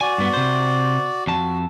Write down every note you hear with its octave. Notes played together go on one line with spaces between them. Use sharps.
F#4 D5 G#5
G2 B3
C3 C5
F2 F#4 A5